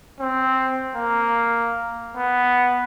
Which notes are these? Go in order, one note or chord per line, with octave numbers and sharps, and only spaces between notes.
C4
A#3
B3